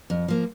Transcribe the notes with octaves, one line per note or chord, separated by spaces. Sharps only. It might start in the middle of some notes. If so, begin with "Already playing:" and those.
F2
F3 A#3